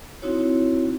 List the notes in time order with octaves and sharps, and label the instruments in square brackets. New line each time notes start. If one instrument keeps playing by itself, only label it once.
[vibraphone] C4 D#4 E4 F#4 C#5